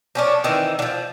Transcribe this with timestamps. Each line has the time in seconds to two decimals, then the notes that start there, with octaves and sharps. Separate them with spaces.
0.15 F3 C#4 D4
0.44 D#3 E3 C4
0.79 D3 F3